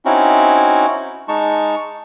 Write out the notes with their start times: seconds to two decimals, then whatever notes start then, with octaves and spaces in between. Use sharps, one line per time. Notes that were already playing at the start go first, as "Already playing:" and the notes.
0.05 C4 C#4 D#4 E4 F#4
1.28 G#3 D#4 A5 C#6